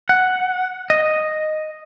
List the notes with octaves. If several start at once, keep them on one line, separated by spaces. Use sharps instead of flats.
F#5
D#5